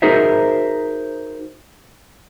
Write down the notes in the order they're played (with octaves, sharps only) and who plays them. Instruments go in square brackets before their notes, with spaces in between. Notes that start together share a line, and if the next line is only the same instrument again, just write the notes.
[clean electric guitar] D#4 F#4 G#4 A#4 C5 E5